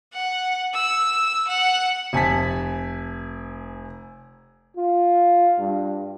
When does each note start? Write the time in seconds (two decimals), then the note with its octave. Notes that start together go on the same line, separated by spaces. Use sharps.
0.13 F#5
0.74 E6
1.48 F#5
2.13 F1 G#5 A5 B6
4.77 F4
5.59 G2